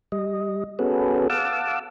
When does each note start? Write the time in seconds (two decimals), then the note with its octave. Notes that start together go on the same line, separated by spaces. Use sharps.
0.12 G3 D#5
0.79 B3 C#4 F#4 G#4 A4 B4
1.30 F5 F#5 A5 D6 E6